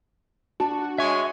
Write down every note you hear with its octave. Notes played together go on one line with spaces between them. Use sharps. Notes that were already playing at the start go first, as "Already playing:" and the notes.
D4 F#4 A5
G#3 C#5 E5 G#5 C#6